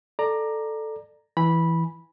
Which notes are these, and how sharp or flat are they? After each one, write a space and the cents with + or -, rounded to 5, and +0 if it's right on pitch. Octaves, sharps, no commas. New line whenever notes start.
A4 +0 D5 +20 A#5 +0
E3 +0 G#5 -5 B5 -10